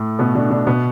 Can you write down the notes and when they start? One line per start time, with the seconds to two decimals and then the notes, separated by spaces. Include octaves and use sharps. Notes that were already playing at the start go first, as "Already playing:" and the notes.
Already playing: A2 A3
0.19 B2 B3
0.35 D3 D4
0.50 D3 D4
0.67 B2 B3